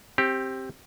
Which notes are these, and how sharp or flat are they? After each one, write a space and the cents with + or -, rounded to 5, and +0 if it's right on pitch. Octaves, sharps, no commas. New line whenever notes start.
C4 +15 G4 +0